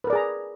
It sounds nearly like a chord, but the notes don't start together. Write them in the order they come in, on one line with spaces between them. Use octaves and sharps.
B4 A#4 D5 G#4 A#5